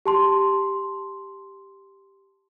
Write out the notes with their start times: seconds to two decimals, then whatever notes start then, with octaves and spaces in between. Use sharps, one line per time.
0.06 G4 A5 C6